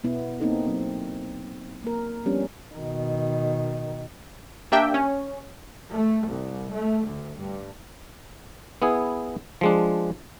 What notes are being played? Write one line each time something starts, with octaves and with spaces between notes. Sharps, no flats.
B2 B3 E4
A#3 C4 D#4 A4
F#3 C4
A#3 A#4
F3 G3 B3 C#4 D4
B2 D#3
A#3 D4 G4 E5 G5
C#4
A3
C2
A3
D2
G2
B3 E4 G#4
F3 G#3 D4